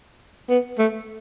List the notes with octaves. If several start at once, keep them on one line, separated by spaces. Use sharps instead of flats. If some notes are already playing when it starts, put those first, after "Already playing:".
B3
A3